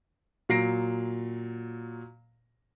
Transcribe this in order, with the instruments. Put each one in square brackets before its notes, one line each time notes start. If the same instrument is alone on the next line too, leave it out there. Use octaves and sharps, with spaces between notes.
[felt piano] A#2 F#3 A#6 C7 D7